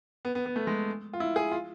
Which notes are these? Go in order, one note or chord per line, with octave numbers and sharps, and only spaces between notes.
B3
B3
B3
A3
G#3
F4
E4
G#4
F4